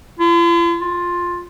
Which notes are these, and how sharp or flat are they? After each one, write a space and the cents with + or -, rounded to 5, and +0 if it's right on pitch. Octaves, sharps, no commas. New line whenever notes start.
F4 -45
F4 +10